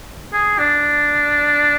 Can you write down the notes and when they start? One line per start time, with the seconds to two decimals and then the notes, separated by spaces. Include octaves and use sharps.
0.33 G#4
0.59 D4